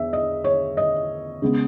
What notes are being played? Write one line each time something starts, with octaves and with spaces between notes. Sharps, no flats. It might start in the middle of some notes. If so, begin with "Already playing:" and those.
Already playing: E2 E5
D#5
C#5
D#5
C#3 G#3 B3